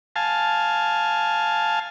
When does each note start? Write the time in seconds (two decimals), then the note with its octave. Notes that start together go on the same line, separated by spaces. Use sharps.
0.16 F5 G#5 A5